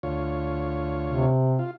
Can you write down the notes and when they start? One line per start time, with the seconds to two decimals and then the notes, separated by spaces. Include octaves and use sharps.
0.03 D2 F4 C#5
1.07 C3
1.59 F4